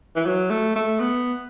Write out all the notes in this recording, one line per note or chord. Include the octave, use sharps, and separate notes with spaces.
E3
F#3
A3
A3
B3